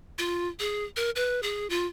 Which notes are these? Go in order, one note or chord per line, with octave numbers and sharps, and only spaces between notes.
F4
G#4
A#4
B4
G#4
F4